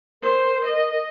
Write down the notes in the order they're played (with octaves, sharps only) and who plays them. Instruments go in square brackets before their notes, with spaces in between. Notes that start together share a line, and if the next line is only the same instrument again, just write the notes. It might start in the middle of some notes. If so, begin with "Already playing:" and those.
[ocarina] A#4 [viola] C5
[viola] D#5